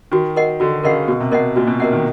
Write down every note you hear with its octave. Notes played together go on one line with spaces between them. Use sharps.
D#3 F#4
A#4 D#5 F#5
D3 F#4
C#3 A#4 D#5 F#5
B2 F#4
C3
B2 A#4 D#5 F#5
A#2 F#4
B2
C3 A#4 D#5 F#5
D#3